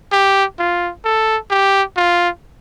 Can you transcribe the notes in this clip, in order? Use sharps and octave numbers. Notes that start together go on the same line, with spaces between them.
G4
F4
A4
G4
F4